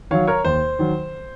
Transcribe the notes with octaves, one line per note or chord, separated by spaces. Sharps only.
D#3 F#3 C#5 F5
A#4 C#5
D#2 C5
D#3 F#3